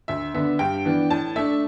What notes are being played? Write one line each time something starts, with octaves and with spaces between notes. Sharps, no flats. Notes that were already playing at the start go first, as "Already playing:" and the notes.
D2 E5
D3 B3 D4 E5
G2 G5
E3 B3 D4
A2 A5
A3 D4 E5